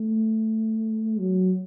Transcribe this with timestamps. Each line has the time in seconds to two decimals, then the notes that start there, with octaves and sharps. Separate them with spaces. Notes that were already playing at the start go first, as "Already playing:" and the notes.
Already playing: A3
1.19 F#3